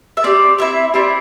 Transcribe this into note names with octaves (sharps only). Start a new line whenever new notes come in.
E5
C4 G4 D5
C4 E4 G4 E5
C4 E4 G4 D5